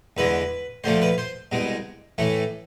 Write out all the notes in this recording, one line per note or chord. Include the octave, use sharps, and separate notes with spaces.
E2 D3 G#3 B4
D2 D3 F3 A3 C5
B4
C5
C2 B2 G#3
A2 E3 A3